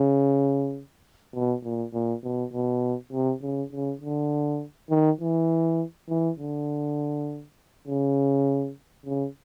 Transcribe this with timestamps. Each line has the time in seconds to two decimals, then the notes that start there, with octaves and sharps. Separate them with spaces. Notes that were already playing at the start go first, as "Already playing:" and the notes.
Already playing: C#3
1.34 B2
1.64 A#2
1.93 A#2
2.24 B2
2.53 B2
3.13 C3
3.42 C#3
3.72 C#3
4.01 D3
4.90 D#3
5.21 E3
6.09 E3
6.39 D3
7.88 C#3
9.06 C#3